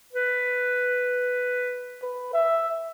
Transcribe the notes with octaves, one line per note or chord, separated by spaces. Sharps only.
B4
B4
E5